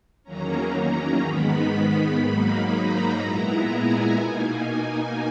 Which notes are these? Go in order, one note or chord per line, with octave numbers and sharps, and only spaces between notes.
E2 D#3 F#3 A#3 C#4 A#5
G#2 D#3 G#3 B3 B5
G#2 F#3 A#3 D#4 B5
A#5
A#2 G#3 B3 E4
G#5
B2 A#3 D#4
G#5